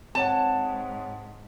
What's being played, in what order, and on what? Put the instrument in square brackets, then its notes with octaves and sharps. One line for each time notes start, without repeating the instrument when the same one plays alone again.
[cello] G#2 [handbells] C4 C#5 F#5 [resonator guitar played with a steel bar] A5